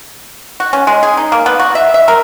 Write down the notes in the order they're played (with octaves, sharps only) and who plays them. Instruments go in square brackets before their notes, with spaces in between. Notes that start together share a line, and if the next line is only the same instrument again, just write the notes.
[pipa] F#4
C#4
G#3
G#4
D#4
A#3
B3
F#4
E5
E5
A#4